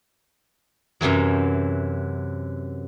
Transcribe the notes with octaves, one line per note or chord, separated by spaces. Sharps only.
F#2 C3 E3 F#3